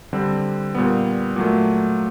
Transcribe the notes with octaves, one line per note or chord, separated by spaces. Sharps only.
D3 G3 C4
A#2 G3 B3
A#2 F#3 A3